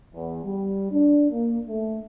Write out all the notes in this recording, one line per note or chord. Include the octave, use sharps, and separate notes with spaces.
E2
G3
D4
A#3
A3